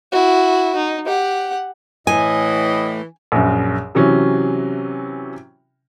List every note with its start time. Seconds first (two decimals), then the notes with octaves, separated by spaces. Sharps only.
0.12 E4 F#4
0.76 D#4
1.07 G4 F#5
2.07 A2 E3 D#5 G#5
3.32 A#1 F#2
3.95 C3 E3 F#3 C#4